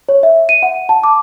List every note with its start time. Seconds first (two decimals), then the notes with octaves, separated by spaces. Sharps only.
0.09 C#5
0.23 E5
0.49 D#7
0.63 F#5
0.89 A5
1.04 D6